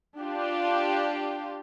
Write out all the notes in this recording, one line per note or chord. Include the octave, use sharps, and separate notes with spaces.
D4 F4 G4